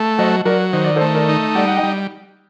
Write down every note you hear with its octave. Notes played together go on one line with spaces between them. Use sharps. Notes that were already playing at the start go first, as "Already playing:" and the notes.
Already playing: A3
F#3 C5 D#5
F#3 A#4 D5
D#3 C5
D5
A4 C5
A3
A#4 D5
D#4
G3 D5 F#5
F#5
D#5 G5
G3